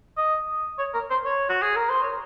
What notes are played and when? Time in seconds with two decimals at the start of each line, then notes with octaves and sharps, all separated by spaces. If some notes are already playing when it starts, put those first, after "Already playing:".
0.17 D#5
0.78 C#5
0.94 A#4
1.10 C5
1.25 C#5
1.49 F#4
1.62 G#4
1.76 A#4
1.90 C5
2.02 C#5